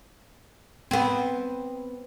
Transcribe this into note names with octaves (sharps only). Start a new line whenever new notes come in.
B3 C4